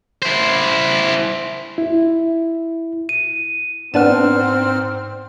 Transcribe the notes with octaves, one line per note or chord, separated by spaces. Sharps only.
E4 C5
E4
D#7
G#2 B3 C4 D4 F6 E7